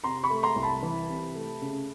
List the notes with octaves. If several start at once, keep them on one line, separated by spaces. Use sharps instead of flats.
C3 A#5 C6
B5 C#6
A3
A#5 C6
C2
A5 B5
E3
C3
A3
C#3